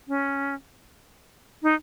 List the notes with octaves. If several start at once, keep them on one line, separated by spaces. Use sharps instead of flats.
C#4
D#4